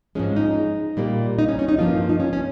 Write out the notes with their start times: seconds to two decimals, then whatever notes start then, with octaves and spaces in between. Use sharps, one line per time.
0.15 G#2 F3 G#3 C#4
0.36 D#4
0.97 A#2 G3 A#3
1.39 D#4
1.48 C#4
1.59 C#4
1.69 D#4
1.78 G2 F3 A#3 F4
2.09 D#4
2.20 C#4
2.33 C#4